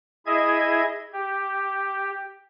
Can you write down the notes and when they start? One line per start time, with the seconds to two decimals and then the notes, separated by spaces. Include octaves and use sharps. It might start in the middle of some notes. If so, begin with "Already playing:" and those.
0.26 E4 G#4 D#5 E5 G#6
1.13 G4